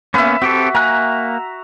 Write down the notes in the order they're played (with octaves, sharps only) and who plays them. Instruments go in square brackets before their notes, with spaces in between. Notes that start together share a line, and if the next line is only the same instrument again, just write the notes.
[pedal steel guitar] A#3 B3 C#4 [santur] B4 E5
[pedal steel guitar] C4 G4 A4 [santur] F#4
[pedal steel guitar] A#3 G#5 F#6 [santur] A#5